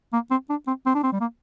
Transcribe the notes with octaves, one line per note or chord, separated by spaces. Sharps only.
A#3
C4
D4
C4
C4
D4
C4
G3
A#3